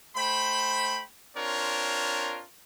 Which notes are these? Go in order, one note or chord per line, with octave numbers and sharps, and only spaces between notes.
A3 C5 G5 B5
C4 D4 F4 A#4 C#5